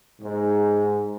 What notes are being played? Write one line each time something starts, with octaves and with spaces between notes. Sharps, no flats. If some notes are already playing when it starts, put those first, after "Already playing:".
G#2